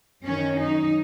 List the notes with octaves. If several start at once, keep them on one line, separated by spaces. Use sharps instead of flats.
F#2 D#3 C#4
D#4